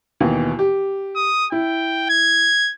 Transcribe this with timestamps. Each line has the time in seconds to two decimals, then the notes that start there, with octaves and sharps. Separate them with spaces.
0.20 D#2 B2 E3
0.59 G4
1.16 D#6
1.52 E4 G5
2.10 G#6